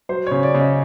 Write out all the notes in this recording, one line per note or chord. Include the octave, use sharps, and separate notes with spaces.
F#3 C5
C#3 C#5
D5
C#3
D#5